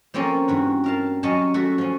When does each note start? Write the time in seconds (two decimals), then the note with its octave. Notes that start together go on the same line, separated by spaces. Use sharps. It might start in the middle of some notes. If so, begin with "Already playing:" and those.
0.14 F3 A#3 C4 C#4 A4 A#4
0.48 G2 E3 F#4
0.84 A#4 F5 A5
1.23 F#3 C#4 D#5 F5 A5
1.54 A3 F#4 A4 E5
1.78 F3 C#4